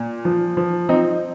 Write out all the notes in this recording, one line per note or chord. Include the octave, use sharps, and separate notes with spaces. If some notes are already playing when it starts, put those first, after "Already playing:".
Already playing: A#2
F3
F3
F3 C4 D#4